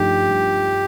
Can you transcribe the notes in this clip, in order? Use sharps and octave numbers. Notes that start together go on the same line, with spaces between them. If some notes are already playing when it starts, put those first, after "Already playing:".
Already playing: G2 F3 A3 D#4 G4
G2